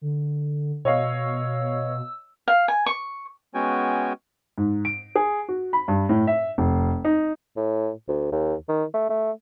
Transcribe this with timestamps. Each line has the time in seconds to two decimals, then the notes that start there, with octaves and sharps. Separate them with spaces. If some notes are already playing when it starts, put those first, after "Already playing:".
0.01 D3
0.85 B2 C#5 D#5 F5 E6
2.48 F5
2.68 G#5
2.86 C#6
3.54 G#3 B3 C#4 F#4 G5 G#5
4.58 G#2
4.85 D7
5.15 G#4
5.49 F#4
5.73 B5
5.88 G2
6.09 A2
6.27 E5
6.58 F1
7.05 D#4
7.56 A2
8.08 D2
8.32 D#2
8.69 D#3
8.94 A3
9.10 A3